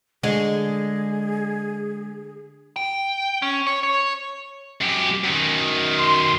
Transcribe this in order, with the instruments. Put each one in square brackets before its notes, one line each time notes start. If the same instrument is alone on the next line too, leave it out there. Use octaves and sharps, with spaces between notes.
[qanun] D3 C#6 [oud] G#3 [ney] G#4
[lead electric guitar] G5
C#4
C#5
C#5
[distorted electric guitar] F#2 G4
F#2 D#3
[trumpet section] C6